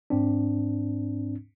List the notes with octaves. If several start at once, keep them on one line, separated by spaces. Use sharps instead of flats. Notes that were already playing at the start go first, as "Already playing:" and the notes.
G#2 C4 D4